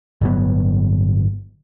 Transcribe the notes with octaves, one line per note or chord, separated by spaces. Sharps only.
G1 A2 F#3 B3